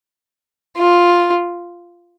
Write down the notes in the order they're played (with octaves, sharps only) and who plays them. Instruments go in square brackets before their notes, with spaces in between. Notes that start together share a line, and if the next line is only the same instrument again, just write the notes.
[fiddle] F4